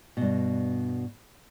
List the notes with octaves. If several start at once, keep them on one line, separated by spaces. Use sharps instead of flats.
G2 B2